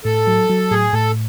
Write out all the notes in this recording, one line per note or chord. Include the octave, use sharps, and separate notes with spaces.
A2 A4
F#3
F#3
A2 G#4
A2 A4